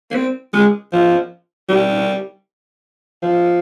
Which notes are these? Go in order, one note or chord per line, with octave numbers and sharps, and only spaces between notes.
A#3
C4
G#3
F3
G3
F3